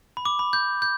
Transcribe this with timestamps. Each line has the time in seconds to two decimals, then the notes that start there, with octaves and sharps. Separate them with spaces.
0.17 B5
0.25 D6
0.39 B5
0.53 G6
0.82 G6